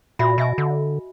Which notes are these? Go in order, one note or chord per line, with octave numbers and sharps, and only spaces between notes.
A#2 F#4 E5 B5
B2 D#5 E5 G#5
D3